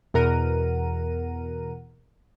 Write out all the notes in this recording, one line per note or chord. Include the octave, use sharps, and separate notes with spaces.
E2 B2 A#4 F#5 A#5 D#7